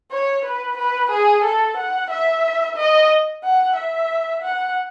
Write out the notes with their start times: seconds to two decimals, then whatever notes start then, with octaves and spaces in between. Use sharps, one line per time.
0.12 C#5
0.45 B4
0.78 B4
1.11 G#4
1.44 A4
1.77 F#5
2.10 E5
2.76 D#5
3.43 F#5
3.76 E5
4.42 F#5